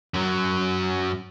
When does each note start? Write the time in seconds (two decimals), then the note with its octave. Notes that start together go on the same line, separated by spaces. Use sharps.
0.14 F#2 F#3